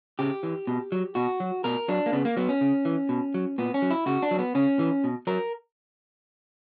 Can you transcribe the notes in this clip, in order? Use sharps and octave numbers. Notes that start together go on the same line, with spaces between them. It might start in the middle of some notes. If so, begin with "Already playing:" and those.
C#3 G4
E3
B2
F#3
B2 F#4
F#3
B2 A#4
F#3 D4
A#3
C#3 B3
A#3
F#3 B3
C#4
C#3
E3
B2
F#3
A#2 B3
C#4
F#3
E4
C#3 F#4
D4
F#3
B3
C#3 C#4
E3
B2
F#3 A#4